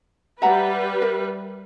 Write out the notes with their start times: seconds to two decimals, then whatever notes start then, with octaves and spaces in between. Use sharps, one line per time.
0.42 G3 B4 E5 F#5 A#5
1.02 A#4 E5